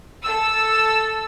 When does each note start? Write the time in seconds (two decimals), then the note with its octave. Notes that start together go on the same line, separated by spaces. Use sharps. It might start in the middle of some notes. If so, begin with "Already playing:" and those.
0.23 A4 E6